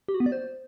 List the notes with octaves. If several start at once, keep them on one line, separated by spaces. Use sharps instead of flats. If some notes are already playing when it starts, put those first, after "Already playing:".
G4
F#4
B3
D5
C5